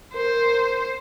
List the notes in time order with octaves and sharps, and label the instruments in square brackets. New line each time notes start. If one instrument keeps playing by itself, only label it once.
[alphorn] A#4 [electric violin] C5